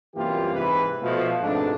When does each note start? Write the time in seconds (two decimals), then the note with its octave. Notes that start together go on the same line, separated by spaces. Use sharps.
0.16 C2 F#2 E3 A#3 F4 G4
0.54 G#2 C3 E3 B4
1.01 B2 F3 A3
1.41 F2 G#2 B2 A3 D4